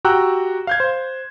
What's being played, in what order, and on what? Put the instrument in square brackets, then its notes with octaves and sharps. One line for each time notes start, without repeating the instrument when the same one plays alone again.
[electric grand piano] F#4 G4 G5 A#5 E6 F#6
F5 G6 G#6
C5